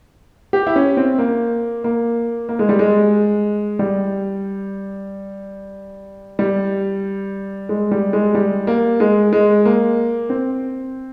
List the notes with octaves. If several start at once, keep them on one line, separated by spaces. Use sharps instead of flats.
G4
E4
C#4
C4
A#3
A#3
A#3
G#3
G3
G#3
G3
G3
G#3
G3
G#3
G3
A#3
G#3
G#3
A#3
C4